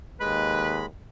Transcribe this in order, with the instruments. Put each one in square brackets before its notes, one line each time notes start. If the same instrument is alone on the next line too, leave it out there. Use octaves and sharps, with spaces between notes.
[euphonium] D#2 [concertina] G#3 B5 [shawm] B4